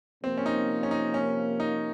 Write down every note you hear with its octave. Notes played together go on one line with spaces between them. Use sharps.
C3 F3 A#3 C4
C#4
D#4
C#4
D#4
C#4
D#4